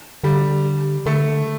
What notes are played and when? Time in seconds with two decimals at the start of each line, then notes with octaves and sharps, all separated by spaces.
0.24 D3 G3
1.06 D3 A3